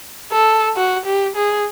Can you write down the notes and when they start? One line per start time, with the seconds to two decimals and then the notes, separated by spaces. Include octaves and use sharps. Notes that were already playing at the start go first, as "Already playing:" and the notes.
0.32 A4
0.76 F#4
1.05 G4
1.36 G#4